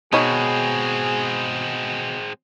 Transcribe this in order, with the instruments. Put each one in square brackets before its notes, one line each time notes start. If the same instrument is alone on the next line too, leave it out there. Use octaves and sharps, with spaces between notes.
[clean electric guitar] B2 [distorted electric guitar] G#3 C4 [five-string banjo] D#4 C#5 [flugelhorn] G#4